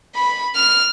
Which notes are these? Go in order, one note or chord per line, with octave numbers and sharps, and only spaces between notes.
B5
F6